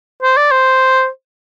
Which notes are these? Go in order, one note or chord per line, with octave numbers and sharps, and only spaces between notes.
C5
D5
C5